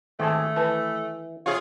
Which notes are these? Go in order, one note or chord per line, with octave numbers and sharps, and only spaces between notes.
G#1 D#3 A3 C4 G#4 A5
E3 B4 A5
C3 F4 G#4 C#5 F5